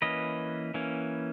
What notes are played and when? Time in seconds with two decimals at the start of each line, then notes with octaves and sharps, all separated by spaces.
0.02 E3 A#3 C#4 B4 D#5
0.74 E3 A#3 C#4